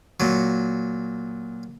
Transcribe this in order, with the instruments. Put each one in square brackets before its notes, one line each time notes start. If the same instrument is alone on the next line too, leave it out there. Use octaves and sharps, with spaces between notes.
[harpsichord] A#2 F#3